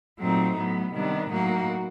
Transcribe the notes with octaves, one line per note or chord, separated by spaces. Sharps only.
A#2 F#3 A3 C4 D#4
A2 F#3 B3
C3 D#3 G3 B3 D4
A2 F#3 A#3 D#4 F#4